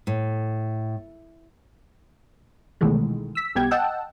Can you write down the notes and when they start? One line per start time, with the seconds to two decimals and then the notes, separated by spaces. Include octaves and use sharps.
0.07 A2
2.81 C2 B2 D#3 E3 G#3 A3
3.35 E6 B6
3.55 B1 B2 G3 B3 G5 G#6
3.71 D#5 F#5 G5 A5 E6